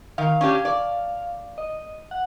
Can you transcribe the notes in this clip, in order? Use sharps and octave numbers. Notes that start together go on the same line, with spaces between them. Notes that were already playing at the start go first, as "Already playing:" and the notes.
D#3 F5
C#4 D4 G4
D5
D#5
F#5